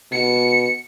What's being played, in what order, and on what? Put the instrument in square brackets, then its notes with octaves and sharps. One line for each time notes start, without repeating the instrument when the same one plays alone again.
[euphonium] B2 [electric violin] C#7